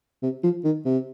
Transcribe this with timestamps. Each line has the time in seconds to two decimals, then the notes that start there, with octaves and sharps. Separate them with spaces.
0.22 C3
0.44 F3
0.64 D#3
0.85 C3